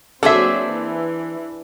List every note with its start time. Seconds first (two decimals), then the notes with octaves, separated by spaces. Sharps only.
0.23 F#3 A#3 C4 D4 G#4 A4 C5 E5
0.69 E3